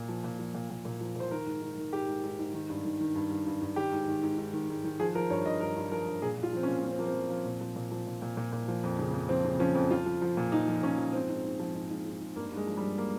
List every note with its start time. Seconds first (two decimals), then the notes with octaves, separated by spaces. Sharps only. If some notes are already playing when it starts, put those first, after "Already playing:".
Already playing: A#2
0.09 F3
0.24 A#2
0.39 F3
0.54 A#2
0.70 A#2
0.85 A#2
1.01 F3
1.16 A#2 C5
1.31 D#3 A#4
1.46 G#2
1.62 D#3
1.78 D#3
1.92 G#2 G4
2.08 G#2
2.24 G#2
2.39 G#2
2.54 D#3
2.69 G2
2.85 D#3
3.00 D#3
3.15 G2
3.31 G2
3.46 G2
3.61 G2
3.76 D#3 G4
3.92 G#2
4.07 D#3
4.23 G#2
4.38 G#2
4.53 D#3
4.69 G#2
4.84 D#3
5.00 F3 G#4
5.15 F3 A#4
5.30 G2 C#5
5.46 G2 D#5
5.60 G2 A#4
5.76 G2
5.92 F3 A#4
6.07 G2
6.22 A#2 G#4
6.38 A#2
6.43 F4
6.53 F3 C4
6.63 C#4
6.68 A#2
6.84 F3 C#4
6.92 C4
6.99 F3 A#3
7.07 C4
7.14 F3
7.30 F3
7.46 A#2
7.61 F3
7.76 A#2
7.91 F3
8.07 A#2
8.22 A#2
8.37 A#2
8.52 A#2
8.68 F3
8.83 F2
8.99 C#3
9.13 F2
9.29 F3 C4
9.45 C#3
9.59 F3 C#4
9.75 F2
9.91 F3 F4
10.06 F3
10.22 F3
10.37 A#2
10.52 F3 D#4
10.67 F3
10.83 A#2 C#4
10.98 F3
11.13 G#2 C4
11.29 G#2
11.44 G#2
11.59 F3
11.74 G#2
11.90 G#2
12.05 G#2
12.21 G#2
12.36 G2 A#3
12.52 G2
12.57 G#3
12.67 F3
12.77 G3
12.82 G2
12.98 A#3